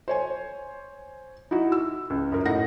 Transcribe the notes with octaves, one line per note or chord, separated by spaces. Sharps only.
C5 C#5 G#5
D#4 E4 F#4
E6
C#2
F#2 A#4
A2 D#4 F#5 A#6